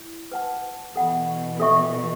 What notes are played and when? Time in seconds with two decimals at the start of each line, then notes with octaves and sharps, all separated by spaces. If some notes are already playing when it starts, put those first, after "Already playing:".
Already playing: E4
0.32 B4 F#5 A5
0.96 B2 E3 A4 F#5 B5
1.60 A4 E5 C#6